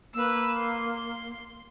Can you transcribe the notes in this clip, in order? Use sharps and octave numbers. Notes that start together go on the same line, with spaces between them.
A#3 B4 E6
C6